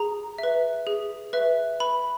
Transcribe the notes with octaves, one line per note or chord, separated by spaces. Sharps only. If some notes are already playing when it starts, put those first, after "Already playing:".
Already playing: G#4 A#5
B4 E5
G#4
B4 E5
B4 B5